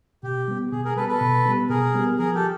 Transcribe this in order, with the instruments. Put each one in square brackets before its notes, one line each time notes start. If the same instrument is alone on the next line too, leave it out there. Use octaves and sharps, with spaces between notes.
[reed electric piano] B2 [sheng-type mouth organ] G4
[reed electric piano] G3 B3
[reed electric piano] B2 [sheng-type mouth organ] G#4
[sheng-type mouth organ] G#4 A#4
[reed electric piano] G3 B3 [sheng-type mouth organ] A4 B4
[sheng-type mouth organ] A4 B4
[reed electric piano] B2
G3 B3
[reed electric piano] B2 [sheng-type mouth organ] G#4 A#4
[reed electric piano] G3 B3
[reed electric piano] F3 [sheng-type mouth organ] G#4 A#4
[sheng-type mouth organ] G4 A4